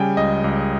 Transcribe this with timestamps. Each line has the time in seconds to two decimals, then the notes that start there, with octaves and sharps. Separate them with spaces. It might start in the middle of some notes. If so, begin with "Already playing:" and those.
Already playing: C#3 G3 G5 G#5
0.17 C#2 D#5
0.44 C#2